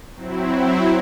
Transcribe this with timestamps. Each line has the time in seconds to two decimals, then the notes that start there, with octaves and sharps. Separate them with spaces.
0.14 F#3 C4 E4